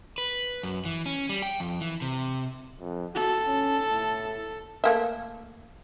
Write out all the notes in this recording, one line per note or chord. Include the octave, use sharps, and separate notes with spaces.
B4
F#2
E3
C#4
G3
G5
F2
E3
C3
F2
F#4 A4
C#4
A2
A3 A#3 E5